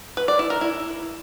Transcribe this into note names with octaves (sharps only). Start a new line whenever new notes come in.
B4
D5
E4
A#4
E4